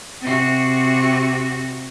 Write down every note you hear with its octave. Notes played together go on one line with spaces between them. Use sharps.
C3 F#4